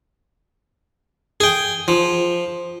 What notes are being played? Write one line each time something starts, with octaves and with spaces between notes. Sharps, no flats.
G#4 G5
F3